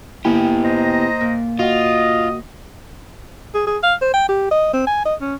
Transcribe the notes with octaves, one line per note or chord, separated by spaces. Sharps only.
A#3 B3 E4 G4 G5 G#5
C5 D#5 A#5
A#2
F4 F#4 D#5 F#5
G#4
G#4
F5
C5
G5
G4
D#5
C4
G#5
D#5
C#4